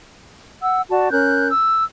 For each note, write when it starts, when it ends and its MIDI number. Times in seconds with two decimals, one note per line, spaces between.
0.63 0.82 78
0.63 0.82 88
0.89 1.08 66
0.89 1.08 74
0.89 1.08 81
1.11 1.49 61
1.11 1.49 70
1.11 1.49 90
1.11 1.49 91
1.50 1.84 88